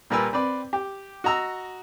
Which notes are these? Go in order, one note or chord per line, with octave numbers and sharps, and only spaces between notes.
A#2 G3 A#4 B4 G#5 E6
C4 B4 D5 B5
G4
F#4 D#5 A#5 E6